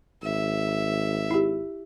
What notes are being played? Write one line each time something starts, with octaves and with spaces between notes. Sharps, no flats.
G#1 E5
E4 G4